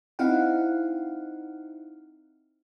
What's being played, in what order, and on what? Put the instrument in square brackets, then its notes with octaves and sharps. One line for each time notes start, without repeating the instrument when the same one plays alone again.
[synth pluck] C4 D#4 E4 F5 F#5